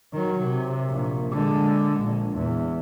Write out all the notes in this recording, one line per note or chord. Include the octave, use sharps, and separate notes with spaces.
D#3 F#3
C3
A#1 A#2
D3 G#3
A#1
E2